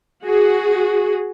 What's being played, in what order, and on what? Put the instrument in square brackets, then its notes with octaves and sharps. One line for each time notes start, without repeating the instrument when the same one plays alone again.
[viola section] F#4 G#4